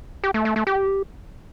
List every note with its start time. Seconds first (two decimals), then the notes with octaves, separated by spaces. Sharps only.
0.24 G4
0.34 A3
0.45 A3
0.56 A3
0.67 G4